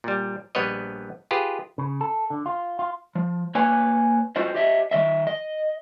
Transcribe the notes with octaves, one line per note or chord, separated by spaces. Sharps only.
A#2 G3
A#1 G3 B3 B4 C#5 D#5
F4 G4 G#4 B4
C#3
A4
D3
F4
F4
F3
A#3 B4 C#5 G#5
F4 F#4 C5 D#5
G4 C#5 D#5 E5
D#3 F3 D#5 E5
D#5